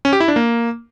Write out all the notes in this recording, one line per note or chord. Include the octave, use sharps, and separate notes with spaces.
C#4
G4
E4
D4
A#3